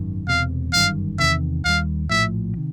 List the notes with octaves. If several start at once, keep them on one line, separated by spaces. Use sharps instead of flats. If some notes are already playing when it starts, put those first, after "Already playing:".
Already playing: G#1 F#2 D#3
E1 E2 C3 F5
G1 F#2 D#3 G3 F5
E2 C3 D#3 E5
D#2 D#3 G3 F5
A#1 A2 F3 E5
C3 D#3